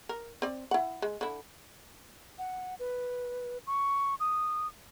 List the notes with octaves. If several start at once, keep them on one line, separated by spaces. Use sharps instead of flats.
A#4
C4 D5
E4 F#5
G#3
D3 E4
F#5
B4
C#6
D#6